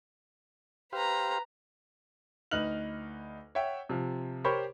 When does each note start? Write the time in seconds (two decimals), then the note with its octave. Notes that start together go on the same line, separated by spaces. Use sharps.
0.93 G4 B4 C5 F5 A#5
2.51 D2 D#4 B4 F6 F#6 F#7
3.55 C#5 E5 F#5 G5
3.89 C3 F3
4.44 G4 A#4 C5 C#5 B5 C#6